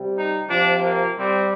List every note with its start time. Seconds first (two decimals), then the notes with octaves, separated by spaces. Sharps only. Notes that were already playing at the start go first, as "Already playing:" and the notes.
Already playing: C3 G3
0.15 D#4
0.48 C3 F3 D4
0.82 A#3
1.15 C3 G3 C4